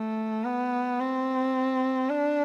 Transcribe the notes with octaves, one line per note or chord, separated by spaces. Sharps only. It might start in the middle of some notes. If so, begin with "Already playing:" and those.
Already playing: A3
B3
C4
D4